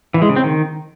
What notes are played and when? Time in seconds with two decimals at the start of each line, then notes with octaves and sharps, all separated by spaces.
0.14 E3
0.22 G#3
0.29 C#3
0.36 C4
0.44 D#3